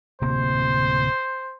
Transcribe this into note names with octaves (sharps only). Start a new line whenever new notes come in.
D1 C3 A#3 C5